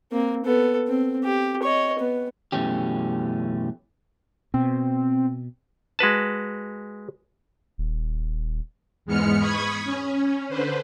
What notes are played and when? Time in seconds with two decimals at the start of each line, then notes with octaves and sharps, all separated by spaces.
0.12 A#3 C4
0.45 B3 A4
0.88 C4
1.24 G4
1.63 C#5 D#5
1.99 B3
2.52 F#2 B2 E3 A3 C#4 G4
4.54 B2 C4
5.99 G#3 F#4 B4 A5
7.78 D#1
9.05 E2 G#2 G#3 B3 F6 C#7
9.38 B5 C#6 D#6 G#6
9.84 C#4
10.49 D3 B4 C5